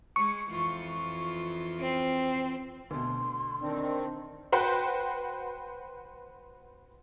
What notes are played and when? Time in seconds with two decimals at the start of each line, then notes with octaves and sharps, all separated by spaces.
0.16 G#3 C#6
0.50 F2 E3 F4
1.78 C4
2.91 D2 B2 C6
3.62 D#3 C4 D4
4.52 F#4 B4 C5 F#5 G5 C6